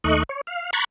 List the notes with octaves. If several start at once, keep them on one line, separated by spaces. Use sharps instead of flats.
D#2 A3 D#4 D#5 C#6 F#6
C#5
F5
A#5 B5 C#6 F#6 G#6 A6